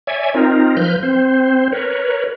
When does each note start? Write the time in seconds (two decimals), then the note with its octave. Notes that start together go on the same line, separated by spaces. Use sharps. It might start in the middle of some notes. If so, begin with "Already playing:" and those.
0.07 C#5 D5 E5 G#5
0.34 C4 D#4 F4 A#4
0.77 F3 B4 F6 G6
1.03 C4 C5
1.72 A#4 B4 C#5